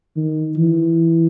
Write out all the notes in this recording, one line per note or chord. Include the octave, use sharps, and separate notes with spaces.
D#3
E3